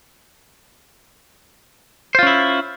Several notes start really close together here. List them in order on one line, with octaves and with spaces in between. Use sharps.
C5 F4 C#4 E4